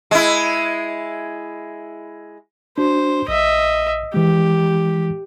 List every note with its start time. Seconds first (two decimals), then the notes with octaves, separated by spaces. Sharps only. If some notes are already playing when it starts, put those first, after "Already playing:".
0.11 G#3 E4
2.78 D4 F#4 C5
3.28 A#1 D#5 E5
4.14 E3 G#3 G4